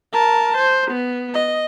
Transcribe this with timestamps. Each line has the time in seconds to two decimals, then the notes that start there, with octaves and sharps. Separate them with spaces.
0.13 A#4 A5
0.57 C5
0.91 B3
1.34 D#5